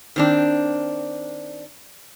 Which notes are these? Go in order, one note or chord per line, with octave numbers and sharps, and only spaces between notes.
D#3 C4 D4